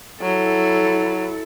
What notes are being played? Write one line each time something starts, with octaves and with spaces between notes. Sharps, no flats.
F#3 E4 A4